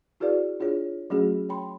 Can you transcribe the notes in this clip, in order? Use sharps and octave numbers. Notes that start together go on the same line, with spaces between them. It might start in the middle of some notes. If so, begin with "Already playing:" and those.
E4 F#4 G#4 B4 D5 F5
D4 F4 G#4 C#5
F#3 A3 C#4 F#4 G#4
C#5 G5 B5 C6